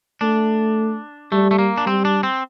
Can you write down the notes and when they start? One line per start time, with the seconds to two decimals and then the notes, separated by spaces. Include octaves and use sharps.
0.21 A3 D4
1.32 G3 A3
1.51 A3
1.59 A#3
1.78 D4
1.87 G3 C4
2.05 D4
2.23 C4